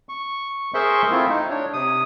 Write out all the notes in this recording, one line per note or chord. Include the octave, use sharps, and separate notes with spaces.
C#6
G#4 A#4 C5 E5 C6 C#6
A3 C4 E4 F4
D#4
D4 C#5
C3 D#6